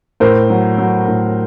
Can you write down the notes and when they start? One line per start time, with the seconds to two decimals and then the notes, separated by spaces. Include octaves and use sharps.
0.20 A2 A#4 C5
0.50 F#3
0.78 F#3
1.08 A2